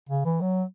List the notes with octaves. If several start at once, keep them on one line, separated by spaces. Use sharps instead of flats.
C#3
E3
F#3